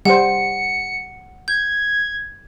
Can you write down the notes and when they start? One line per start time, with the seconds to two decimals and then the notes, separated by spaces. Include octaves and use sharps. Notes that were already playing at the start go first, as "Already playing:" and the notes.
0.05 G3 C5 F#5 C#7
1.48 G6 G#6